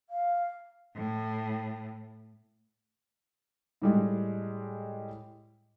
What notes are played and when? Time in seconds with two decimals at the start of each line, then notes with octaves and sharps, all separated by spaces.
0.10 F5
0.96 A2
3.82 A2 G3 G#3